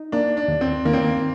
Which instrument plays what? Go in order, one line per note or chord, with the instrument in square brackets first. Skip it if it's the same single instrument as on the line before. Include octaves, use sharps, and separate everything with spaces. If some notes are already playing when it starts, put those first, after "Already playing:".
Already playing: [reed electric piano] D#4
[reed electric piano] A#3 [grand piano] D4
[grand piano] D4
[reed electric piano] D#2
[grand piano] C4
[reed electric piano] D#3 [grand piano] A#3
[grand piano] C4
A#3